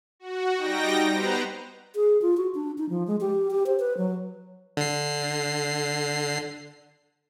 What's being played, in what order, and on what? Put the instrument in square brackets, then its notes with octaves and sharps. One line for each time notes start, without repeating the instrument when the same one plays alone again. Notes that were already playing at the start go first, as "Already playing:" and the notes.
[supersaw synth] F#4
G3 D#4 G5 A#6
B3 B4 C5 A#5
[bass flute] G#4
F4
F#4
D4
D#4
F3
G#3
G4
G4
C5
B4
F#3
[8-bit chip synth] D3 C7